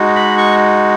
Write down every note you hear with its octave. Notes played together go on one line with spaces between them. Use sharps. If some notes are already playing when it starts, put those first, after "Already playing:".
Already playing: G#3 D#4 F#4
B5
C#6